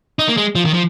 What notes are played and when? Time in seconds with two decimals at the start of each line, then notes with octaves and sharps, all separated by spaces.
0.19 D#4
0.28 A#3
0.37 G#3
0.55 F3
0.65 D#3
0.74 F3